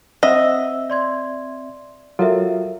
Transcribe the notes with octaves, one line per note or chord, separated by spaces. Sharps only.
C4 C5 D#5 E5 F#5 E6
D5 C6 G#6
F#3 F4 A4 A#4 E5